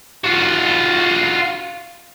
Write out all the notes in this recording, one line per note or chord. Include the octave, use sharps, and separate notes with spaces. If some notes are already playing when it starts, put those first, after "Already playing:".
F4 F#4